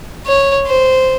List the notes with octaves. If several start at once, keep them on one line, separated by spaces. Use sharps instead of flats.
C#5
C5